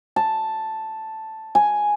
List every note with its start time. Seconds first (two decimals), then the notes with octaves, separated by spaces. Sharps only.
0.16 A5
1.55 G#5